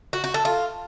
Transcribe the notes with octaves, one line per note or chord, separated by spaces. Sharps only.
F#4
F#4
A4
F4